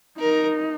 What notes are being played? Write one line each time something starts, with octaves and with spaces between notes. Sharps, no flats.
D#4 A#4